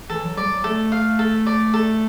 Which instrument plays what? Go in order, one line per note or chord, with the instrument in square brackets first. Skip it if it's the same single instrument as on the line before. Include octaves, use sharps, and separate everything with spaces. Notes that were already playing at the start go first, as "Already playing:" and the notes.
[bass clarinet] E3 [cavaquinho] A4
[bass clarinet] F#3
[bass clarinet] G3 [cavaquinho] D5
[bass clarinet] F#3
[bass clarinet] A3 [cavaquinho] A4
[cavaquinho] F5
A4
D5
A4